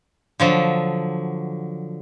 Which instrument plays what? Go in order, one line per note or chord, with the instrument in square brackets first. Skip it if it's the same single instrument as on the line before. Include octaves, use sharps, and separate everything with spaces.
[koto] D3 F3 F#3